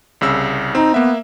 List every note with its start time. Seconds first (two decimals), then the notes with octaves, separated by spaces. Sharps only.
0.21 C2 C#3 E6
0.75 C4 D#4
0.94 A#3 B3 E5